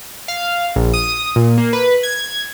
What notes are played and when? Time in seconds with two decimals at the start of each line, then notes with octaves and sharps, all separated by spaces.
0.28 F5
0.76 A#1
0.94 D#6
1.36 A#2
1.58 A#3
1.73 B4
2.03 G#6